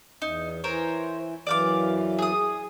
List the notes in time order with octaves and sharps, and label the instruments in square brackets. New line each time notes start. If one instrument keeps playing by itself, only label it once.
[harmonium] E2 [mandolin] D#4
[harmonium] E3 [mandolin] A#4 C5 C#5
[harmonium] F#2 E3 [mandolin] D5 F5 D6
[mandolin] G#4 D#6